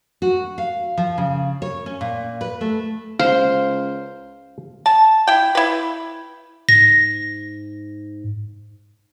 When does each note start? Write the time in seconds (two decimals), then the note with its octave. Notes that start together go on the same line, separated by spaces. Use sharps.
0.22 F#4
0.58 F5
0.98 F3
1.18 C#3
1.62 C#5
1.86 C#4
2.01 A#2
2.41 B4
2.61 A3
3.19 C#2 C5 F5
4.86 A5
5.27 E4 G5
5.55 E4 B4
6.69 G#2 A#6